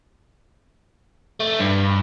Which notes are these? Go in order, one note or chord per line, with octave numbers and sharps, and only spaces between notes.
A3
G2